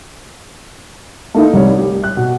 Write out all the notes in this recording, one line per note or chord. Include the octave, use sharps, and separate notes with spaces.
A3 A#3 D#4 E4
C2 G3 C#5
G4
F#6
B2